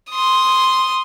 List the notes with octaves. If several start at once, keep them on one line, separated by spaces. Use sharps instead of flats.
C6 D#6